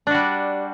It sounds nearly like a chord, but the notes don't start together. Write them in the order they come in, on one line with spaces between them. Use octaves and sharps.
D4 F#4 G3